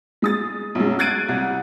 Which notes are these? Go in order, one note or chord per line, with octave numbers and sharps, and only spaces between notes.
G#3 D#6 A6
B1 F#2 G#3
F#6 G#6 A6 C7 D7 D#7
C2